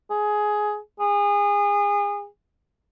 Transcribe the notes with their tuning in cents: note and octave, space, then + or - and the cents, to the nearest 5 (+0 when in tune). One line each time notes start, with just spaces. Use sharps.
G#4 +15
G#4 -30